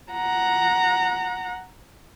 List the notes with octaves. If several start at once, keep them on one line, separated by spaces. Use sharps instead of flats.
F#5 A#5